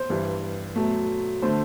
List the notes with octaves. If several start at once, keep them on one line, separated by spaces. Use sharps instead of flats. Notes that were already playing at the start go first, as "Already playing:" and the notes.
Already playing: C5
G2 E3 G3
B2 F#3 A3
D3 A3 C5